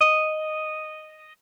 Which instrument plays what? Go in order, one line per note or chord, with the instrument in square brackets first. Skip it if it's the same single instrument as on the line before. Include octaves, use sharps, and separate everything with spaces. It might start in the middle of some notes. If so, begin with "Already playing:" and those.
[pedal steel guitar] D#5